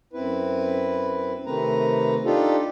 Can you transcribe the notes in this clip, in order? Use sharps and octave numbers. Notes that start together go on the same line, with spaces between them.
F#2 C4 E4 B4
C3 D#3 A3 C4 B4 A#5
D4 D#4 F4 G4 A4